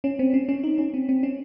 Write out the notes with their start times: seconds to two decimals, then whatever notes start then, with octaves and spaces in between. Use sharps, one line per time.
0.04 C#4
0.19 C4
0.34 C#4
0.49 C#4
0.64 D#4
0.78 C#4
0.94 C4
1.09 C4
1.23 C#4